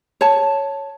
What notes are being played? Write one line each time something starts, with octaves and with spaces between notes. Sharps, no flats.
C#5 A5